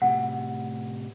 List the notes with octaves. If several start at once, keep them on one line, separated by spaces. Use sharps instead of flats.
A2 C3 F#5